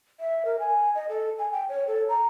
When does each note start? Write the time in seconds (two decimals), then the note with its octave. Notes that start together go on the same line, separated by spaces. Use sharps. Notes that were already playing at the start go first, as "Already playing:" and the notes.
0.20 E5
0.45 A#4
0.59 G#5
0.95 D#5
1.09 A4
1.38 G#5
1.52 G5
1.69 C#5
1.87 A4
2.09 A#5